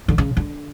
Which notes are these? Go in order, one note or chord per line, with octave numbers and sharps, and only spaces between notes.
D3
C#3
D3